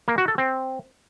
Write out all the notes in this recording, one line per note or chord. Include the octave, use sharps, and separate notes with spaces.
A#3
F#4
A4
C4